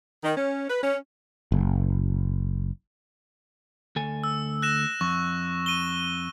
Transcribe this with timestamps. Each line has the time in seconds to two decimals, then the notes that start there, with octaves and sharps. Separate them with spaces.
0.24 D#3
0.37 C#4
0.70 B4
0.83 C#4
1.52 F#1
3.96 D2 A4 G#5
4.24 E6
4.62 F#6 A#6 E7
5.01 F2 C#6
5.66 D#7 G7